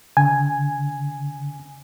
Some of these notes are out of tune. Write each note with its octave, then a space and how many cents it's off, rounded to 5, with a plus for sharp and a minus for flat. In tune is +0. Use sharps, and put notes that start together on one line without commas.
D3 -40 G#5 +0